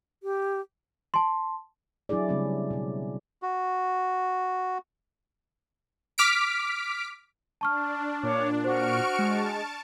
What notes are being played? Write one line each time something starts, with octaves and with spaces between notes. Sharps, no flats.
G4
A5 C6
F#3 D4 E4 G#4 D5
C#3 G3 A3 C4 C#4
B2 G3
F#4
D6 F6 B6 D7
D4 A5 C#6 F6
A#2 D4 C#5 D6
F#4 C5 C#6 F6 D7
G#3 A5